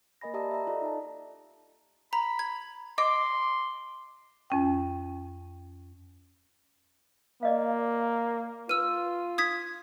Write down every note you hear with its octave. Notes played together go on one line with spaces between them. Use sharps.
A#3 A#4 D#5 G#5 B5 A#6
G4 D5 E5 A5 A#5 D#6
E5 A#5
F4 A4 D5 D#5
D#4 A5
A#5 B5
G#6
D#5 C6 D6
F2 C#4 G5
A#3 D5 D#5 F5
F4 B4 E6 D#7
D#6 G#6 B6